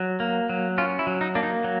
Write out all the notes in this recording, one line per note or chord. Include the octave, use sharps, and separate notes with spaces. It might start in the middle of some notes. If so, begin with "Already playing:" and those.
Already playing: F#3
A#3
F#3
C#4 F4
E4
F#3
D#4
A#3 D4
D#4
F#3